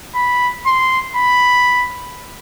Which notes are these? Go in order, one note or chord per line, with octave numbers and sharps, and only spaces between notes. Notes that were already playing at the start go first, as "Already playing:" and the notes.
B5
C6
B5